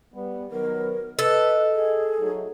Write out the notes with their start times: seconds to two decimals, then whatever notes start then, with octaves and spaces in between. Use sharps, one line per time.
0.14 G3 B3
0.51 D#3 F#3 B3 A#4
1.19 A4 B4 D#5
1.75 G#4
2.19 F#3 A3 D#4